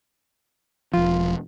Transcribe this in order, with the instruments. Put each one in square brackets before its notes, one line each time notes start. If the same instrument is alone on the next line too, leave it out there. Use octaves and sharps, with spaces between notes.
[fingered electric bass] E1 F3 [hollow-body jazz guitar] F4